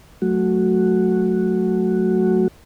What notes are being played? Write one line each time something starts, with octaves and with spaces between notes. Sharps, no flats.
F#3 A3 F#4